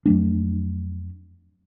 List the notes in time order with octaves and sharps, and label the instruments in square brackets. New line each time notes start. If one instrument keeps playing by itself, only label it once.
[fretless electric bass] F2 F#3 A3 D4